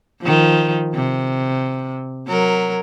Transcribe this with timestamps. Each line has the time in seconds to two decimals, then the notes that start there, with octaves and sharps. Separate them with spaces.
0.21 D#3 F3
0.94 C3
2.28 F#3 A#4